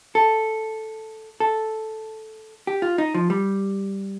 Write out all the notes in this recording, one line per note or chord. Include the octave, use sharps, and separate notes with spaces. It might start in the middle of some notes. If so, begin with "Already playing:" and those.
A4
A4
G4
F4
D#4
F3
G3